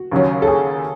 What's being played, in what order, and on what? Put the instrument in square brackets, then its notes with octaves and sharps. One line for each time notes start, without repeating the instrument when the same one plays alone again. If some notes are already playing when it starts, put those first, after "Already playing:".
Already playing: [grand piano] F#4
[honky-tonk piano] D#2 C#3 F#3 C#4
[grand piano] A4
G#4